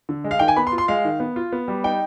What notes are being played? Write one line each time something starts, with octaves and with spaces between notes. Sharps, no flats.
D3
G#3
F5
D#3 G5
G#5
B3 B5
C6
F4
C6
G#3 F5
D#3
B3
F4
B3
G3
D#4 G5